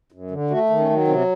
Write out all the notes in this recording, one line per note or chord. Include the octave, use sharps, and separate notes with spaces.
F#2
D3
A3 F#4
D#3
C#4
F#3
C3 C4